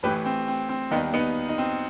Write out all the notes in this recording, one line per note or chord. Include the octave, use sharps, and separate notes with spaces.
A1 A2 E3 G4 B4
C4
C4
C4
D#2 D#3 G3 B3 D#4
B3 D#4
D#4
C4